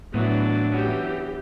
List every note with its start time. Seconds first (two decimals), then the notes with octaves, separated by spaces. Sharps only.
0.14 A2 E3 F#3 B3 D4
0.72 E3 B3 C#4 F#4 G4